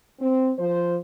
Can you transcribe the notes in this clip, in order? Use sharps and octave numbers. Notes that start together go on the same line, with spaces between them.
C4
F3 C5